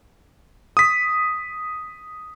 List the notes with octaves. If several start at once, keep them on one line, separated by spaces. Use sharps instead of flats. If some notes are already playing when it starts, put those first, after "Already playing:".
D#6 B6